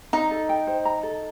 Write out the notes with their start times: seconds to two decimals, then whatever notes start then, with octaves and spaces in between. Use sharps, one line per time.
0.13 D#4 A#5
0.31 A4
0.49 G5
0.67 C5
0.85 A#5
1.03 A4